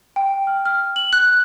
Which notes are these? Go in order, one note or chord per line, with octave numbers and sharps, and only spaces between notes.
G5
F6
F6
F#7
F#6